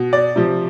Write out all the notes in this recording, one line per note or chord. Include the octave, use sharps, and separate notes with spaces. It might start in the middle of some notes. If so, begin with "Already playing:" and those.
Already playing: B2
D5
C3 F3